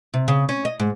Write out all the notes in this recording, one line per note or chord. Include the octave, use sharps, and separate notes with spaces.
C3
C#3
C#4
D#5
G#2